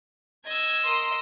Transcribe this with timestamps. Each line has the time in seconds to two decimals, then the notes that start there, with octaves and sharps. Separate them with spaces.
0.46 D#5 E6 G#6
0.84 A#4 C6 D#6